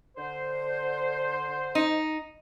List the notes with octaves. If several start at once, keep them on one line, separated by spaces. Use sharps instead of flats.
D3 C5
D#4